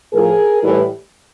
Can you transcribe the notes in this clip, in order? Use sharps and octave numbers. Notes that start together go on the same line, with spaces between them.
A2 F3 G#4 A#4
A2 E3 G3